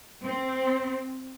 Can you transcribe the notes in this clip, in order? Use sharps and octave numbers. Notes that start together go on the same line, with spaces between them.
C4